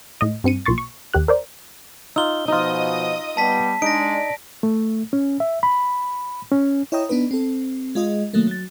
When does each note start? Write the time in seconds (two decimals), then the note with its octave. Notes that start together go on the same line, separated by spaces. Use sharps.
0.21 A2 D#5
0.44 G2 C4 C#7 D#7
0.66 B1 A#2 C6 C#6 A6
0.78 C#6
1.14 D#2 G4 F#6
1.28 A#4 C5 D5
2.16 D#4 F4 E6 G7
2.48 B2 F3 D#4 F4 D#5 D#6
3.37 G3 B3 A5 B6
3.82 G#3 D4 D#4 D5 A#6 D7
4.63 A3
5.13 C#4
5.40 E5
5.63 B5
6.52 C#4
6.92 E4 C#5 D#5 G5 A#5 D#6
7.09 B3 D4 D#4 B4
7.31 C4 A4
7.95 G#3 F4 D#5
8.33 D#3 F#3 A3 A#3
8.47 F#3 A6